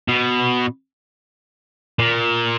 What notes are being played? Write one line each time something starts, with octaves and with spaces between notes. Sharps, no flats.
B2
A#2